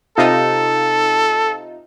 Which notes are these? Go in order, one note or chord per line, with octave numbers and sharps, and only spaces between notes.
C3 D#4 F4 A4